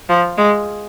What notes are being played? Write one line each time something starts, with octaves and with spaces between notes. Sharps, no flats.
F3
G#3